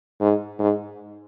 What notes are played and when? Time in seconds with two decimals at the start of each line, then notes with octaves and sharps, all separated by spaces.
0.21 G#2
0.59 G#2